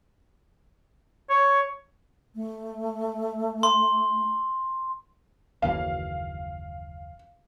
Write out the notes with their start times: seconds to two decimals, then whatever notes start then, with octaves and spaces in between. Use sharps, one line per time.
1.30 C#5
2.35 A3
3.63 C6
5.62 F#1 D#2 E3 F5